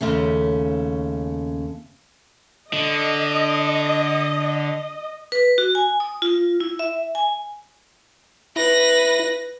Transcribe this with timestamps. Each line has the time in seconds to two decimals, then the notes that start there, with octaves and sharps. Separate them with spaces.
0.01 D#2 C#3 A3 C#4
2.73 D3 D#5
5.32 B4
5.58 F#4
5.75 G#5
6.00 D#6
6.22 F4
6.60 E4
6.79 E5
7.15 G#5
8.56 E4 B4 A#6